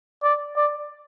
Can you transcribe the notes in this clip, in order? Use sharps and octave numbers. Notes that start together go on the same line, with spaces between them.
D5
D5